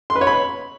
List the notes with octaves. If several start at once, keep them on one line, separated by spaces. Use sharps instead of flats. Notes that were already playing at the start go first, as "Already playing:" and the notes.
C6
B4
C#5
B5